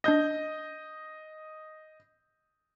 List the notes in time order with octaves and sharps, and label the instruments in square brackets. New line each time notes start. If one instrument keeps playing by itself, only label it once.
[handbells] D4 A#6 [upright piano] D#5 G6